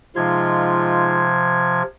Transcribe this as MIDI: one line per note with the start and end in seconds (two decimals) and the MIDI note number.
0.16 1.83 48
0.16 1.83 53
0.16 1.34 56
0.16 1.34 63
0.16 1.34 65
0.16 1.83 92